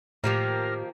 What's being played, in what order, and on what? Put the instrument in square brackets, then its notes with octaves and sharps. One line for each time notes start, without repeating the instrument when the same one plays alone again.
[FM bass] A2 [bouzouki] D#3 F3 A#3 [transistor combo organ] F4 A#4 F6 [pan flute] G4